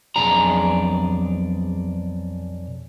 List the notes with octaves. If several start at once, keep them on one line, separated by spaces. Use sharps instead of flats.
B1 F2 D4 G#4 A#5